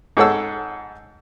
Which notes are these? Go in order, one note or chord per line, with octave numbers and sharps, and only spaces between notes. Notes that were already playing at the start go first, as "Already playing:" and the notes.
G#2 G#4 A4 C#5 F#5 E6